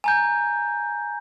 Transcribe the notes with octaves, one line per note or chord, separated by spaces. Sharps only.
G#5 A#5 G6